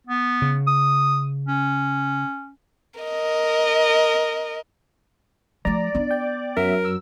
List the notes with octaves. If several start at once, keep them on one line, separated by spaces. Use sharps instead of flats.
B3
C#3
D#6
C#4
A#4 D#5
F3 A3 D5 A#5
B3 D4
G5
F#2 F#3 A#4 E5
E6